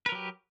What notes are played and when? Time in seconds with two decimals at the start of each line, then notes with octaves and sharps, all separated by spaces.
0.06 B4
0.09 A#4
0.12 F#3
0.15 G4